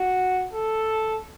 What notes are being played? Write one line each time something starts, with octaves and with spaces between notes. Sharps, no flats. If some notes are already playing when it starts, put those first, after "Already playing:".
Already playing: F#4
A4